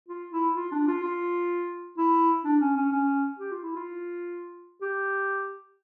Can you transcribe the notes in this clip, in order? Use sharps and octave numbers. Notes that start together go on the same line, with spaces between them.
F4
E4
F4
D4
F4
F4
E4
D4
C#4
C#4
C#4
G4
F4
E4
F4
G4